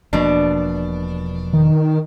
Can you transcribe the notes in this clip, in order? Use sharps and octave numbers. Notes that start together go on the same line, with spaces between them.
E1 B2 F3 A#3 D4
D#3